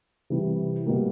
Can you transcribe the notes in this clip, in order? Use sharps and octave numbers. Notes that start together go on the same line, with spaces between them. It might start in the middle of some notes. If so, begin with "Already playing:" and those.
C3 E3 G3
B2 G3 A#3